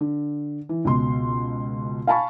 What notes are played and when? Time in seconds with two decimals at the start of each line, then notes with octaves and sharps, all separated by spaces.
0.01 D3
0.69 E3
0.85 C#2 B2 C6
2.07 F5 G#5 A5 B5 C#6